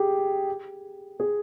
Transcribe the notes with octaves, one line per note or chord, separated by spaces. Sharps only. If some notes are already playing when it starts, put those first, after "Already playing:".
Already playing: G4 G#4
G#4